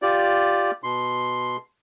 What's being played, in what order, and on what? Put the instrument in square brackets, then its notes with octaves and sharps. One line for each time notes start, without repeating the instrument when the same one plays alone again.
[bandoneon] F4 G4 D5
B2 C6